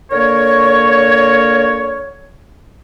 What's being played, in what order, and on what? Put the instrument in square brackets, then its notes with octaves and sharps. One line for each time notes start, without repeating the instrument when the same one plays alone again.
[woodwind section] D3 A#3 A#4 C#5